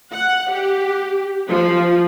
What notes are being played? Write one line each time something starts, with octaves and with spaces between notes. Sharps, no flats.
F#5
G4
F3